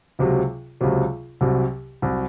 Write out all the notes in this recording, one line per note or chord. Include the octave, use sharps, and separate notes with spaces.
C#2 C3 F#3
C#2 C3 F#3
C2 C3 F#3
C2 C3 F#3